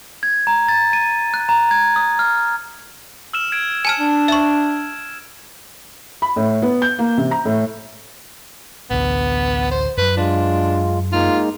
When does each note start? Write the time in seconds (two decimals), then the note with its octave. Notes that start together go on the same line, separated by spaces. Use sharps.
0.23 G#6
0.47 A#5
0.69 A6
0.93 D#7
1.34 F#6
1.49 A#5
1.71 G#6
1.96 D#6
2.19 F6
3.33 E6 F6 E7
3.52 G#6 D7
3.85 G#5 A5 F6 E7
4.00 D4
4.28 E5 C#6
6.22 B5
6.36 A2
6.62 B3
6.82 G6
6.99 A#3
7.18 C3
7.31 A#5
7.45 A2
8.90 A1 D2 B3
9.71 C5
9.97 F#2 F#3 B4
10.17 G#3 D4 F4
11.12 G#3 A#3 D#4 F4